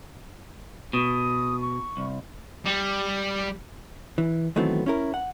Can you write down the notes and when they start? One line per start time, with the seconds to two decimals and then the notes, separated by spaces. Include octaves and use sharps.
0.93 B2 D#6
1.62 C#6
1.97 C2
2.66 G3
4.18 E3
4.56 D#3 E3 F#3 A3 B3 C4
4.86 C#4 E4 A#4
5.14 F#5